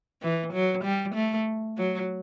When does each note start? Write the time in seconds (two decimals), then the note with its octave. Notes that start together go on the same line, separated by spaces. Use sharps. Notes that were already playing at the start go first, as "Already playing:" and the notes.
0.22 E3
0.53 F#3
0.84 G3
1.15 A3
1.77 F#3